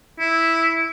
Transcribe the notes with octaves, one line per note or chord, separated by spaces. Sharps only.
E4